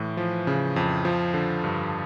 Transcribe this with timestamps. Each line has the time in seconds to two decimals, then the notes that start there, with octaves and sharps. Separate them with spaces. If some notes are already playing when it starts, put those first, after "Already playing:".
Already playing: A2 E3
0.17 F3
0.47 C#3
0.76 F2
1.05 F3
1.34 D3
1.64 G2